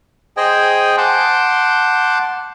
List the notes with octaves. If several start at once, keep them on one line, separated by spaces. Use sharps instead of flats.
G#4 C5 D#5 G5 G#5
F#5 A5 C6 D6 G6